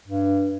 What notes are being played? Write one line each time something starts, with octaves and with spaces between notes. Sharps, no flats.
G2